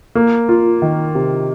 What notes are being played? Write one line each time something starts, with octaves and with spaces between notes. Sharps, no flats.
A#3
F4
D#3
C3